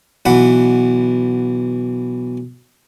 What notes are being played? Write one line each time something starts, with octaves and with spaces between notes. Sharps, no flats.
B1 E3 B4 F#5